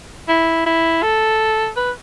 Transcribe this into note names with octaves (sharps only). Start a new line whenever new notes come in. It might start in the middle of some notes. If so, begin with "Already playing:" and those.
E4
E4
A4
B4